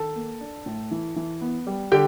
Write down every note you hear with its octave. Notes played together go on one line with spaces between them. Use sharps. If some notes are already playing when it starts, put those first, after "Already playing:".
Already playing: D#3 A4 A5
A#3
D4
A2
E3
E3
B3
G3
D3 G4 G5